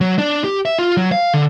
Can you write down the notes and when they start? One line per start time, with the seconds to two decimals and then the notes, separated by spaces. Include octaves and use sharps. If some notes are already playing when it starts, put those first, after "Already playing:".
0.01 F#3
0.19 D4
0.44 G4
0.65 E5
0.79 F4
0.97 F#3
1.12 F5
1.34 D3